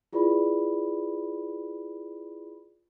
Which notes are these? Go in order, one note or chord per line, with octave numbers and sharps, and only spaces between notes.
E4 F4 G#4 B4 D5 B5